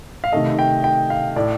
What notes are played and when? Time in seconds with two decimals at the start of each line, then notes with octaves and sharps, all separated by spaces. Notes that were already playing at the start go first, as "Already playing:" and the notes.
0.24 F5
0.32 C3 D#3 A3 D#5
0.59 G5
0.84 G5
1.10 F5
1.36 A2 A3 D5